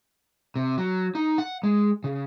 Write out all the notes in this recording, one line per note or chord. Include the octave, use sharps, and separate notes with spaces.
C3
F#3
D#4
F#5
G#3
C#3